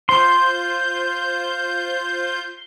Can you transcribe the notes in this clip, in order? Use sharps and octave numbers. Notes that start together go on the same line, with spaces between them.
F4 C5 C6 G6